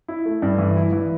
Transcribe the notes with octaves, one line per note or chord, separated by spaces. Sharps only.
E4
A3
G2
E3
E4
E3